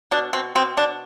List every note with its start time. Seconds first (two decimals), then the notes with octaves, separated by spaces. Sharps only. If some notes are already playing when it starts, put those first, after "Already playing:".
0.11 B2 D4
0.33 B2 C4
0.55 B2 C4
0.77 B2 D4